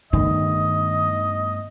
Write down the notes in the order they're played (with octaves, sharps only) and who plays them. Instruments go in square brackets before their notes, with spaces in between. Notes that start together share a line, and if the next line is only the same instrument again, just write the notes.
[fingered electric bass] G2 A3 B3 [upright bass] D#3 [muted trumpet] D#5